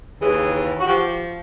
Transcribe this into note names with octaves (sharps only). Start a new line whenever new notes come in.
D#2 C#3 E3 G#4
F#4
F3 G4